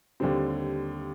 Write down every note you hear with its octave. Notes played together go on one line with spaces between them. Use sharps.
D#2 D3 G3 C4